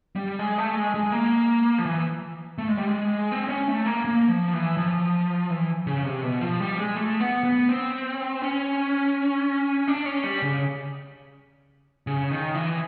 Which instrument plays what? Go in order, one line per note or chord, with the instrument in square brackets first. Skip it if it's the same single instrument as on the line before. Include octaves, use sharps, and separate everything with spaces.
[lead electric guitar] G3
G#3
A3
G#3
G#3
A#3
F3
E3
A3
G#3
G3
G#3
C4
C#4
A3
A#3
A#3
F3
E3
F3
E3
C#3
C3
B2
F3
G3
G#3
A3
B3
B3
C4
C#4
D4
C#4
G3
C#3
C#3
D#3
E3